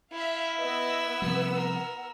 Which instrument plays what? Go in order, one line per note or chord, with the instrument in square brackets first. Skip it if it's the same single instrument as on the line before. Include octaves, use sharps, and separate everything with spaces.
[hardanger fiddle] E4 [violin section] E5 F5
[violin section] B3 E6 [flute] D#5
[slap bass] C3 F3 G3 [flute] F#5
[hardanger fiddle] A#4